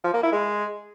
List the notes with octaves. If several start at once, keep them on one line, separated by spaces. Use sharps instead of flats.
F3
A#3
E4
G#3